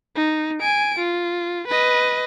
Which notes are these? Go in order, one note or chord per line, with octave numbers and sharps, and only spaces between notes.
D#4
G#5 D7
F4
B4 D#5